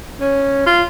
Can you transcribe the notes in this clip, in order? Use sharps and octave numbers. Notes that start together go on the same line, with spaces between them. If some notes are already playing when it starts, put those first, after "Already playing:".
C#4
F4